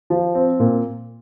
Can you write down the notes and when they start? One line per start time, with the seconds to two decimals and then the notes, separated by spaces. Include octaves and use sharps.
0.10 F3
0.35 C4
0.60 A#2